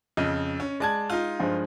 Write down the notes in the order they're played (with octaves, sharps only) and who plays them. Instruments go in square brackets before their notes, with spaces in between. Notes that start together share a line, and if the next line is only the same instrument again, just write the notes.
[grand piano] F2 C#3 [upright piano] D#5
[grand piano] C#4
[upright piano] G#3 [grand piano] D5 A5 G#6
[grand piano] D#4 F4
[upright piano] G2 F3 G#3